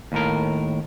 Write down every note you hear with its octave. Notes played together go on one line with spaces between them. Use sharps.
D#2 A2 A#4